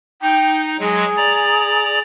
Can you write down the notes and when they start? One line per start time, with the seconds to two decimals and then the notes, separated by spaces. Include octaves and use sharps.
0.22 D#4 G5
0.79 F#3 G#3 G#4
1.17 D5 A#5